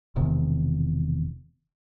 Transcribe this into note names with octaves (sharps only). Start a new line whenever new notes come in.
E1 E2 C3 D#3